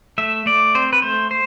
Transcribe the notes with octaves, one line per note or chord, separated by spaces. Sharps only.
A3 E5
A3 D5
C4 C5
B4
A3 C5
C5